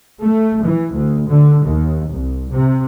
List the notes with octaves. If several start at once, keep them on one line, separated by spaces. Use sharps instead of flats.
A3
E3
D2
D3
D#2
C2
C3